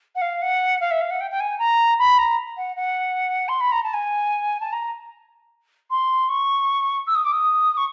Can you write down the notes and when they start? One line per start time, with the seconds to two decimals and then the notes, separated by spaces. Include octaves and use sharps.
0.15 F#5
0.21 F5
0.42 F#5
0.80 F5
0.91 E5
1.01 F5
1.10 F#5
1.20 G5
1.30 G5
1.40 G#5
1.59 A#5
1.98 B5
2.18 A#5
2.57 F#5
2.76 F#5
3.48 C6
3.60 B5
3.72 A#5
3.83 A5
3.93 G#5
4.60 A5
4.72 A#5
5.90 C6
6.29 C#6
7.07 E6
7.15 D#6
7.25 D6
7.32 D#6
7.77 C#6